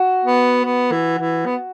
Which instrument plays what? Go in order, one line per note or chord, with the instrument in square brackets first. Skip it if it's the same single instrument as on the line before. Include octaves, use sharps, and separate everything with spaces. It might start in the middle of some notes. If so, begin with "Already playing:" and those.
Already playing: [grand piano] F#4
[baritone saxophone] B3
B3
E3
E3
B3